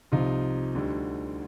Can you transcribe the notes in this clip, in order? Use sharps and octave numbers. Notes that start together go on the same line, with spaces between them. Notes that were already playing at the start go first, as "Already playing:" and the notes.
C2 C3 F3 D#4 F4
D2 D3 G3